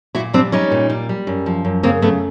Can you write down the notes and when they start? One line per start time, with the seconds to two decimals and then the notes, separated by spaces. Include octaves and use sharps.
0.15 A#2 E4 F#4
0.34 G3 C4 D4
0.52 G3 C#4 D#4
0.71 A#2
0.90 G3
1.09 G3
1.27 F#2
1.46 F3
1.65 F#2
1.83 C#3 A#3 C4
2.02 F#2 A3 B3